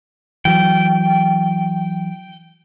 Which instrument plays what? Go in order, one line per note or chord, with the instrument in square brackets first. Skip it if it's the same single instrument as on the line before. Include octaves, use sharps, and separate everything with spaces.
[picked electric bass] E3 F#3 [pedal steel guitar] G5